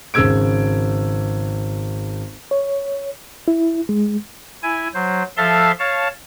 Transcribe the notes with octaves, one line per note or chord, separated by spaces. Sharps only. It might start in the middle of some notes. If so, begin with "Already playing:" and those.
G#1 C#3 E6 G#6 D7
C#5
E4
G#3
E4 G#5
F#3 C5
F3 A4 E5 F5 A5 C6
C#5 F5 A5